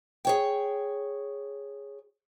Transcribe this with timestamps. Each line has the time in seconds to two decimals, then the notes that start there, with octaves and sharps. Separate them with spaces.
0.25 G#4 C#5 G5